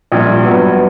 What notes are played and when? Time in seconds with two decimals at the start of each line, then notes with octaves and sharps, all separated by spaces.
0.12 A#1 A#2 G3
0.45 G2 F#3 B3